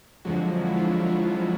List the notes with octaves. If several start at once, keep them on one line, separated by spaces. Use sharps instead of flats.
F2 D3 F3 F#3 G#3 F#4
E4
F4
E4
F2 D3 F3 G#3 F4